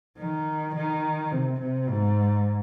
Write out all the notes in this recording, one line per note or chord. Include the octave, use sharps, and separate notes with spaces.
D#3
D#3
C3
C3
G#2